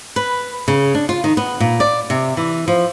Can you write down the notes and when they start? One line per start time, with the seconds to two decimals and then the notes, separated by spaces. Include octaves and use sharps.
0.16 B4
0.68 C#3
0.95 D4
1.09 F4
1.24 D#3
1.37 B3
1.60 A#2
1.80 D5
2.10 C3
2.37 E3
2.68 F3